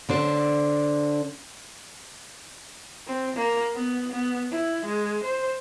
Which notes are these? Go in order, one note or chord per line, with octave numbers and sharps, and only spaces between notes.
D3 D4 C5
C4
A#3
B3
B3
E4
G#3
C5